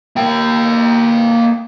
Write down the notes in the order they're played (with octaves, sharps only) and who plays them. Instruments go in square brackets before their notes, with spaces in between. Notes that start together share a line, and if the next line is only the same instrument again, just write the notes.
[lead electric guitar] A#3 G5